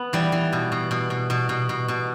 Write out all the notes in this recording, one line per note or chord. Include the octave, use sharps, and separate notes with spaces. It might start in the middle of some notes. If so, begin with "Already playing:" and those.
Already playing: B3
E3 G3
E3
B2
B2
B2
B2
B2
B2
B2
B2